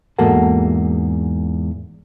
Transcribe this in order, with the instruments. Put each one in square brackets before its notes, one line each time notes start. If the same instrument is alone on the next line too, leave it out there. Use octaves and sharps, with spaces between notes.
[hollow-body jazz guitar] E2 G#2 A#3 F#4 A4 F#5